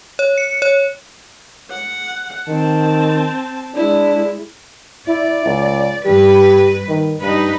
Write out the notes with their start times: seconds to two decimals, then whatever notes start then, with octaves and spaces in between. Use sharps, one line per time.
0.19 C#5
0.38 C#7
0.62 C#5
1.71 F#5
2.49 D#3 C4 A5
3.75 G#3 D4 E4
5.08 E4 D5
5.46 C#2
6.05 G2 G4 B4
6.89 D#3
7.23 G2 D#4 B4